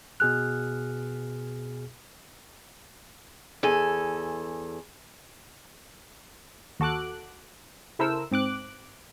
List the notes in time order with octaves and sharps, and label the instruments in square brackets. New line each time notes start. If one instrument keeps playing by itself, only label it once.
[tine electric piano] B2 G#4 F6 [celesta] F#6
[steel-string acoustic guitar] E2 A4 G#5
[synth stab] D#2 F#4 A4 D6 F#6
C#3 E4 A4 A#4 C5 E6
G#2 C4 D6 F#6